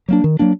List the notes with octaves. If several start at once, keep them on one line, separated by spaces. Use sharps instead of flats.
F#3 A#3 D4
D#3
F#3 A#3 D4